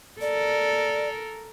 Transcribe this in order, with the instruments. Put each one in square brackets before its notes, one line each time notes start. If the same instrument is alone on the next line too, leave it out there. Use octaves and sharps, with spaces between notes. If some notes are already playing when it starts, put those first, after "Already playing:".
[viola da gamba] A4 A#4 [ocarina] D5